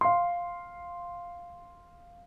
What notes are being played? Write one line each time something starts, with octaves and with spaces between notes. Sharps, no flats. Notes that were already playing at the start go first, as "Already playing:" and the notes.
F5 C6